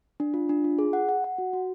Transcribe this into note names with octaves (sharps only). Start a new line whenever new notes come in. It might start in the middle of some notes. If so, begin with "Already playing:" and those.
D4
F4
D4
F4
G#4
F#5
F#5
F#5
F#4
F#4